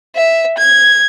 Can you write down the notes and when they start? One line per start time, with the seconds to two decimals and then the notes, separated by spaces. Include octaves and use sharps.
0.16 E5
0.58 G#6